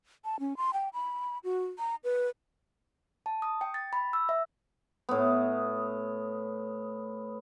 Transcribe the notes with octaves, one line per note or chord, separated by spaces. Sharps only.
A5
C#4
C6
G5
B5
F#4
A#5
B4
A5
D#6
G5
A6
B5
E6
E5
A2 B3